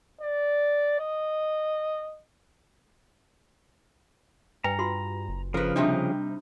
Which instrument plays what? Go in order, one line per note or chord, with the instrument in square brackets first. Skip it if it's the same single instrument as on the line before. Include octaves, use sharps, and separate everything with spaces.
[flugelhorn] D5
D#5
[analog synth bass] G2 [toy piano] B4 G5 G#5 [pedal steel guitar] A#5
[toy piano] F4 F#4 C6
[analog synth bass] F#1
[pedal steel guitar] C#3 F3 [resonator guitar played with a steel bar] A#4 B4
[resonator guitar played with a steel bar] C3 G3 D#4 [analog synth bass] C4 [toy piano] D4